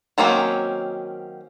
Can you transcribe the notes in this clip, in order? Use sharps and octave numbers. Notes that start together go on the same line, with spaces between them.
D#3 F#3 A#3 C4 C#4